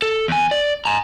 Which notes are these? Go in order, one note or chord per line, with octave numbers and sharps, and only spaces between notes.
A4
E2 G#5
D5
G#5 A#5